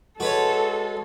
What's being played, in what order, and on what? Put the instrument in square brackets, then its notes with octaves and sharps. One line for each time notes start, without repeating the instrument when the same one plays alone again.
[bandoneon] G#3 [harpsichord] F#4 B4 C#5 [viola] A4